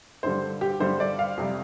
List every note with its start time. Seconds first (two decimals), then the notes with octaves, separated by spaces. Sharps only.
0.23 G2 D3 G3 C5
0.61 G4
0.80 G2 D3 G3 C5
1.00 D5
1.19 F5
1.37 F2 C3 G3